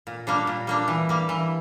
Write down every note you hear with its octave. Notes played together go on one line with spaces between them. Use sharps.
A#2
G3 A#3 D4
A#2
G3 A#3 D4
E3
G3 A#3
E3